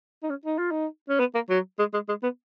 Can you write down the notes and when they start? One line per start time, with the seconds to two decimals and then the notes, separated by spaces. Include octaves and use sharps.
0.23 D#4
0.30 C#4
0.45 D#4
0.58 F4
0.71 D#4
1.09 C#4
1.20 B3
1.35 A#3
1.50 F#3
1.79 G#3
1.93 G#3
2.09 G#3
2.23 B3